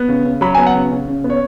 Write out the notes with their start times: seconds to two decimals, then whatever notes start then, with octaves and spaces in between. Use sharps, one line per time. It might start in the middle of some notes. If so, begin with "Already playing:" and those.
Already playing: B3
0.09 C#3
0.25 C#3
0.41 F#3 B5
0.55 G#5
0.58 B3
0.67 F#5
0.75 C#3
0.91 C#3
1.07 C#3
1.24 B3
1.30 C#5